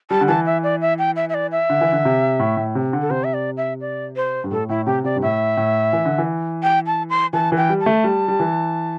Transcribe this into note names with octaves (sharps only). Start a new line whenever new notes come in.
G3 A5
D3
E3 A5
E5
D5
E5
G5
E5
E5
D5
E5
D3
E3
D3
C3
A2
A2
C3
D3
A4
C3 C5
E5
D5
E5
D5
C5
G2
A2 A4
A2 E4
C3 G4
C3 D5
G2
A2 E5
A2
E3
D3
E3
G5
A5
C6
E3 A5
E3
G5
G3
A5
A3
G3
G3
E3